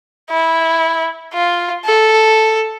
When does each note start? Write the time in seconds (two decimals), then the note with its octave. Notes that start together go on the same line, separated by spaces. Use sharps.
0.30 E4
1.34 F4
1.85 A4